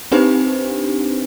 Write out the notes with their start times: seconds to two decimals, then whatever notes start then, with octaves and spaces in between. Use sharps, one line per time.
0.12 C4 D4 D#4 G4 B4 C5